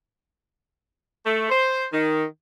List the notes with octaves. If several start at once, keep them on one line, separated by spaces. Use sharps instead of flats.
A3
C5
D#3